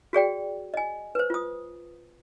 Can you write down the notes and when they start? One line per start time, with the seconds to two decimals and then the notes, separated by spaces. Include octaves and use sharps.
0.13 F#4 G#4 D5 G5
0.74 D#5 G#5
1.15 B4 C5
1.30 F4 D#6